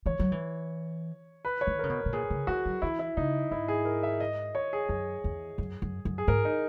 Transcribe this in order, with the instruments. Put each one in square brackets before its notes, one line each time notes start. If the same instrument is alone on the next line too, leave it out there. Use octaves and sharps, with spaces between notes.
[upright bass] E3 [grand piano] C#5
[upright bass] F#3
E3
[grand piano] B4
C#5
[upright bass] D#3
[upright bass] C#3 [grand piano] A#4
[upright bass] B2
B2
[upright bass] A#2 [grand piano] G#4
[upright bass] C#3
[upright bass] E3 [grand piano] F#4
[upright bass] F#3
[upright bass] E3 [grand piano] E4
[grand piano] E4
[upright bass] C#3 [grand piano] D#4
[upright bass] G#2 [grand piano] E4
[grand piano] G#4
A#4
E5
D#5
C#5
G#4
[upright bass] F#2 [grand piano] G#4
[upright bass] E2
F#2
F#2
F#2
[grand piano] G#4
[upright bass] G#2 [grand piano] A#4
[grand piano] D#4